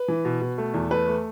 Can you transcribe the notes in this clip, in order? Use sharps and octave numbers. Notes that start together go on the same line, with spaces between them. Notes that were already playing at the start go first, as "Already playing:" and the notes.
Already playing: B4
E3
B2
B2
A3
E2
A3 B4
A3